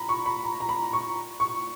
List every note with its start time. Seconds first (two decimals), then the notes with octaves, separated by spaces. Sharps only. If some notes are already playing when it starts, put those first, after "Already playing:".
Already playing: A#5 B5
0.09 C#6
0.26 B5
0.44 A#5
0.60 A#5
0.69 B5
0.93 C#6
1.40 C#6